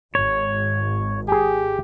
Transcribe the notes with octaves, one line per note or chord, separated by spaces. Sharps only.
G#1 C#5
G4 G#4 G#5